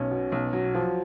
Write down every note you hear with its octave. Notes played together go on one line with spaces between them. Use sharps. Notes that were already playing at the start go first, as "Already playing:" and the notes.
Already playing: B1 C#4
B2
B1
F#3
F3